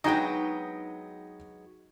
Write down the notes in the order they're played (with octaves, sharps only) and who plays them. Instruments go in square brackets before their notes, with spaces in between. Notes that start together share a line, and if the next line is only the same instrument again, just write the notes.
[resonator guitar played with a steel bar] F#3 G#3 B3 [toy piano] D4 D#4 A#5 [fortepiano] D#5 G5